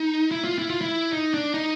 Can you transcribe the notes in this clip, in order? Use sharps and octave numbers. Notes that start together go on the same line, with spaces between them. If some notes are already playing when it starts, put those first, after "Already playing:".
Already playing: D#4
E4
F4
E4
F4
E4
D#4
D4
D#4